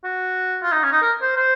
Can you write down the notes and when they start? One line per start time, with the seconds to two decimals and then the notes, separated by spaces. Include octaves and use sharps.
0.04 F#4
0.63 F4
0.73 D#4
0.83 C#4
0.92 D#4
1.03 A#4
1.22 C5
1.37 C5